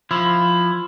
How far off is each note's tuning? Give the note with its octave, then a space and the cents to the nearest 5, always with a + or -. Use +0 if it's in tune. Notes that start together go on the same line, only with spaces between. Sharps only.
F3 +0 E4 +15